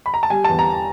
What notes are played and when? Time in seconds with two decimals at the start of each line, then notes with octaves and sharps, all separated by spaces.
0.06 B5
0.14 A#5
0.23 A5
0.30 G3 G#5
0.45 E2 A5
0.59 A#5